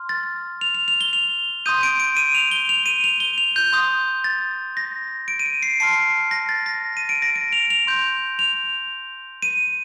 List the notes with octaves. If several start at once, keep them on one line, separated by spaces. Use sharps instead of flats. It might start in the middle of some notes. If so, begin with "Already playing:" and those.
Already playing: C6 F6
A6
F7
F7
F7
G7
F7
C6 D#6 G6 D#7
D7
D7
D#7
F7
G7
F7
D#7
F7
G7
F7
G6
C6 D#6 G6
A6
A#6
D7
D#7
D7
C7
A5 C6 F6 C7
A#6
A6
A#6
D#7
D7
A#6
D7
F7
F7
C6 G6
F7
D#7